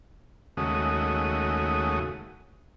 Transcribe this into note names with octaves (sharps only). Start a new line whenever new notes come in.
D#2 C#3 G#3 A3 F#4 D#6